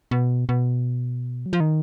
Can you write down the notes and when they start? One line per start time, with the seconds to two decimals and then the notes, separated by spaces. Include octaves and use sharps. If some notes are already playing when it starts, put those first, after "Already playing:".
0.11 B2
0.49 B2
1.46 F#3
1.53 F3
1.60 D#3